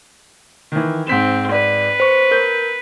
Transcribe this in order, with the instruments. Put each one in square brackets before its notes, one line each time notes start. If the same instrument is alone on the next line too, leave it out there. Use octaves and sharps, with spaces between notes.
[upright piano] D#3 E3
[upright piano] G#2 B6 E7 [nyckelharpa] C4
[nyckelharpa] B4 [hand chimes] D5
[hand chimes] C5 C#6
[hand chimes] A#4 [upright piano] G6